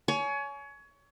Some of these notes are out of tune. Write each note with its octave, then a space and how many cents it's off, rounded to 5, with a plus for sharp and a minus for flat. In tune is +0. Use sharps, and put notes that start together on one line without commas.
C#5 +25 G#5 +30